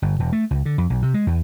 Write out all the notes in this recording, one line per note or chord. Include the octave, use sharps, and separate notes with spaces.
G1
E1
A3
C#2
D3
F2
B1
C3
G#3
E2